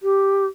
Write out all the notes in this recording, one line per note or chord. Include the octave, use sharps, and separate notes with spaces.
G4